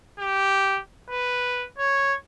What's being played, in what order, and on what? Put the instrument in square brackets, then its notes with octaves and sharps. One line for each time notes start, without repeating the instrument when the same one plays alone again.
[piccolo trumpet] G4
B4
C#5